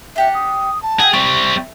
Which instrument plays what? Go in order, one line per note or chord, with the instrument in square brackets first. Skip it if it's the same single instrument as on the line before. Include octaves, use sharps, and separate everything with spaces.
[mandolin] D4 G4 F#5 [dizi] E5
[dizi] D#6
A5
[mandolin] F#4 E5 G5 [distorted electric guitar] G#4
[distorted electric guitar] G3 C4 [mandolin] E4 [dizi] C#6